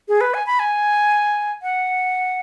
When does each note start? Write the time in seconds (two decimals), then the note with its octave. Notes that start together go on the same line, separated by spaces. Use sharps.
0.08 G#4
0.21 B4
0.34 G#5
0.46 B5
0.59 G#5
1.62 F#5